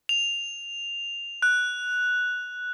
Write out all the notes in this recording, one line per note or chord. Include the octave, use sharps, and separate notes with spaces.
F7
F#6